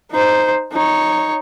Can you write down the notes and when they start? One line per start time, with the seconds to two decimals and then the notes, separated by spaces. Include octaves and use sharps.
0.12 D#4 C5
0.73 D#4 C#5